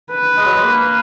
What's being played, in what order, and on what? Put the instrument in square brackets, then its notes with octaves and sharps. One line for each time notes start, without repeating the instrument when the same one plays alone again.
[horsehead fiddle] B4
[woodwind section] G#3
F#3
G#3
A#3